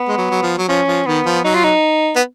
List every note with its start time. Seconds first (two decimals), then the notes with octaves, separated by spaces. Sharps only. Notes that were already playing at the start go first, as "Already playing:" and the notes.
Already playing: B3
0.08 G#3
0.18 F#3
0.31 F#3
0.42 F3
0.58 F#3
0.68 F3 C#4
0.88 F3
1.06 D#3 B3
1.26 F3
1.44 F#3 D#4
1.55 F4
1.64 D#4
2.16 B3